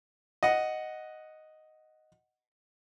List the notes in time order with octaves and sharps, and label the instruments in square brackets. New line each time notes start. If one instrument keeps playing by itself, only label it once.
[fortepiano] D#5 F#5